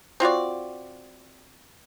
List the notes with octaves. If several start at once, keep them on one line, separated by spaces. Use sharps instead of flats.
C4 F4 F#4 D5